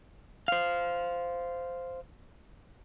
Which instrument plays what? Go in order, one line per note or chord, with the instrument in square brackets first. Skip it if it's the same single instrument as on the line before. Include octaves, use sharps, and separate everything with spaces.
[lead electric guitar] C5 F5